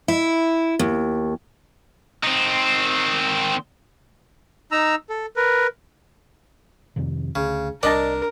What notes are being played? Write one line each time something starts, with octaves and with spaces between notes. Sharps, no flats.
E4
D#2
D#3 C4
D#4 A#5 E6
A4
A#4 B4
F2 C3 D#3
D2 C#3
C2 D4 A#4 D5 D#5 A5